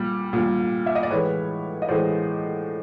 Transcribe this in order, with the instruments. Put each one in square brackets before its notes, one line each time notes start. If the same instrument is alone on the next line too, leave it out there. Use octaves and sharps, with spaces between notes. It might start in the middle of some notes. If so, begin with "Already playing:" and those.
Already playing: [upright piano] A#2 G3
A#2 G3
E5
D#5
D5
A2 E3 G#3 B4 C#5
D#5
A2 E3 G#3 C5 D5